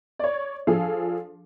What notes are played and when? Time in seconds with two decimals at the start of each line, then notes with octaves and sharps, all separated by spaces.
0.19 C#5 D5
0.67 F3 D4 G#4 A4 F5